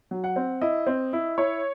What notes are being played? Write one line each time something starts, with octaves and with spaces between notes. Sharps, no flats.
F#3
F#5
C4
E4 D#5
C4
E4
E4 C#5